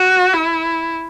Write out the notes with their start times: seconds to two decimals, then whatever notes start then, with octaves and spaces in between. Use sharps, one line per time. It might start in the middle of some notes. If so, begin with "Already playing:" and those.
Already playing: F#4
0.33 E4